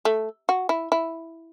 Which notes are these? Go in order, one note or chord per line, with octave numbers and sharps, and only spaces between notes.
A3
F#4
E4
E4